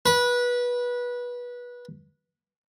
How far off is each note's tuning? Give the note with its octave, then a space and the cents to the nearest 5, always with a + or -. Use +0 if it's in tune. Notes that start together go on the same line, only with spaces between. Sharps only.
B4 -20